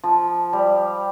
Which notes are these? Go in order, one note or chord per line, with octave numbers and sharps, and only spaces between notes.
F3
G3